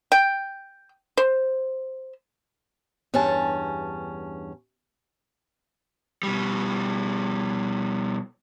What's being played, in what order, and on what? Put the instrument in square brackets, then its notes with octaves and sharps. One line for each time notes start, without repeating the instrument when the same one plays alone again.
[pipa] G5
C5
[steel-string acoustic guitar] E2 G2 C#4 A5
[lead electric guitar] B2 G3